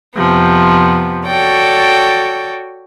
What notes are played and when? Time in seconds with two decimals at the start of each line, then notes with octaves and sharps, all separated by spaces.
0.16 F2 C3 F3 B3
1.27 F#4 A4 C#5 D5 G5